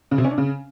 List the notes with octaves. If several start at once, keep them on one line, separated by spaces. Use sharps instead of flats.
C#3
C3
C#4
D4
C#3